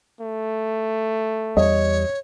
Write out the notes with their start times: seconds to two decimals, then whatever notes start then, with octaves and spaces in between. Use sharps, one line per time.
0.20 A3
1.57 E2 G3 C#5 D#5